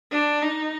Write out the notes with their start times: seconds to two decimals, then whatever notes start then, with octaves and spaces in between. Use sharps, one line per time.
0.12 D4
0.42 D#4